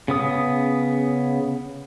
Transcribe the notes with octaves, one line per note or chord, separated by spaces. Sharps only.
C#3 B3 D#6